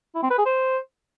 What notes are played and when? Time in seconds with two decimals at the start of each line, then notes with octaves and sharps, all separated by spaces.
0.15 E4
0.23 C4
0.30 B4
0.38 G#4
0.46 C5